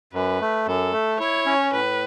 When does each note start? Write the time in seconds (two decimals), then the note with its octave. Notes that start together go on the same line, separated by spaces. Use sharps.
0.13 F#2 B4
0.41 A3
0.67 F#2 A4
0.93 A3
1.19 E4 C#5
1.46 C#4
1.73 A2 B4